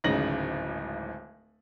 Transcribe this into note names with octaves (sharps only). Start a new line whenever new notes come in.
D1 G#1 C#3 D#4 A#6 F#7